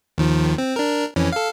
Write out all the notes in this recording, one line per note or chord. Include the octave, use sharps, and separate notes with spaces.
D#2 D#3 F3
C4
D4 A#4
F2 E3 C#4
A4 F5